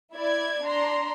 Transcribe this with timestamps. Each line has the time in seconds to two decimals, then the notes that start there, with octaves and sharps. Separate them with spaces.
0.13 E4 D5 G#6
0.63 D4 A#5 C6